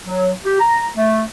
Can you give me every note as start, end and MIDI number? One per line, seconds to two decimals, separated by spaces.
0.06 0.30 54
0.44 0.58 67
0.59 0.86 82
0.95 1.21 57